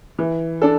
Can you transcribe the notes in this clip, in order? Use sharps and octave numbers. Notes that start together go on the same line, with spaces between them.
E3
D4 A4